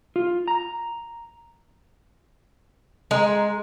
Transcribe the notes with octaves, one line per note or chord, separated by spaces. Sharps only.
F4
A#5
G#3 G#4 A#5 C6